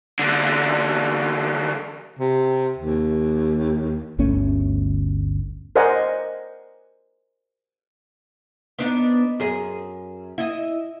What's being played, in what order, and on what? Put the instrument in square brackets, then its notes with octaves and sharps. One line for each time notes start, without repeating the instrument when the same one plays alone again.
[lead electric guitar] E2 D3
[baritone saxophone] C3
D#2
[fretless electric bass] G1 D2 A3 C#4
[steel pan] A#4 C5 D5 D#5 F#5 G#5
[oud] B3 D4 D#4
F#2 G#4
E4 D#5